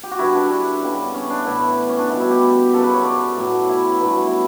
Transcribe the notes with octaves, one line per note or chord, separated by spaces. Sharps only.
G4
F#4
G2 D3 G3 E4
D4
D4
C#3 G3 B3
C#4
D4
A2 E3 B3 E4
C#4
D4
B2 G3 B3 E4
E4
G4
F#2 C#3 F#3 B3 A4
B4
C#5
D5
A2 F#3 B3
E4
G2 F#3 B3
E4